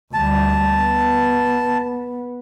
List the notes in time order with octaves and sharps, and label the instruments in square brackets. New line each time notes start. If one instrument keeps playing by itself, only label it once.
[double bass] D2 G3 [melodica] A5
[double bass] B3